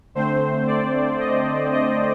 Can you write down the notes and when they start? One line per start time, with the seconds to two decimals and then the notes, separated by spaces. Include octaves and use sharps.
0.15 D3 A3 C4 C5
0.67 D5
1.20 D#5
1.73 D#5